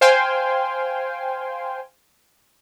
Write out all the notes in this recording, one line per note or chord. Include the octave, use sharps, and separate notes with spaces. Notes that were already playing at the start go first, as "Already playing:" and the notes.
C5 F5 G5 G#5 C6